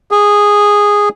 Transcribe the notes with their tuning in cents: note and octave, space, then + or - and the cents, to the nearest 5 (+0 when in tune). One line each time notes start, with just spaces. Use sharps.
G#4 -10